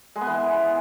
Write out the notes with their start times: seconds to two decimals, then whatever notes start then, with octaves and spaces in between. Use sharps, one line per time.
0.16 G#3
0.21 B3
0.27 E3